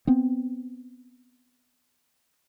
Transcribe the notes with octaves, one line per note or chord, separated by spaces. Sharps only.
B3 C4